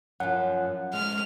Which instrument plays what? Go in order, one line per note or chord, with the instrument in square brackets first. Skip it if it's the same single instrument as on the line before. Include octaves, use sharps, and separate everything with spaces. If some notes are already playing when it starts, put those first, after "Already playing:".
[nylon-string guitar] F#2 F3 [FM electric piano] F#5
[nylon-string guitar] G#3 [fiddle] F6